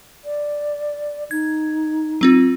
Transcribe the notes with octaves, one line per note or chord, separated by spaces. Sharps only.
D5
D#4 G#6
F#3 C4 F4